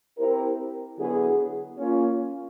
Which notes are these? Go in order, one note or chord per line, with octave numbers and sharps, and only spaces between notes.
C4 E4 G4 A#4
D3 F#3 B3 E4 G#4
A#3 C#4 F4